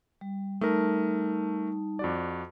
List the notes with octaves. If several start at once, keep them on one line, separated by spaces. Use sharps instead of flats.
G3
G3 A3 D#4 A#4 A5
F2 F#4 D5